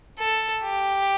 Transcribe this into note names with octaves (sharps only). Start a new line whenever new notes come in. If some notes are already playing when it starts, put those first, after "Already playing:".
A4
G4